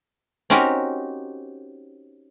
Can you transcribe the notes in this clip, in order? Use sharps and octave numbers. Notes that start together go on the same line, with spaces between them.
C4 C#4 D#4 F#4 G4 A#4